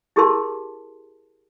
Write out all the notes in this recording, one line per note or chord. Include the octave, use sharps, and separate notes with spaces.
E4 G4 G#4 A#4 A5 C6